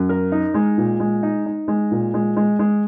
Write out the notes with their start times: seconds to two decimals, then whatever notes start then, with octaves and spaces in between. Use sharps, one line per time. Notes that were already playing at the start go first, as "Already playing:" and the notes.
Already playing: F#2
0.09 A#4
0.32 D#4
0.54 G#3
0.77 A#2
1.00 G#3
1.23 D#4
1.46 D#4
1.68 G#3
1.91 A#2
2.14 G#3
2.36 G#3
2.59 G#3